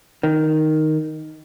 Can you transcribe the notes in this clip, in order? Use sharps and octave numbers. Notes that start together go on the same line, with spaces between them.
D#3